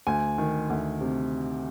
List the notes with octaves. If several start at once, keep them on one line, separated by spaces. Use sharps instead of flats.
D2 G#5
D#3
D2
C3